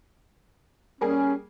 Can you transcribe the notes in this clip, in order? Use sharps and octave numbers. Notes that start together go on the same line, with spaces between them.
G3 A#3 C#4 G#4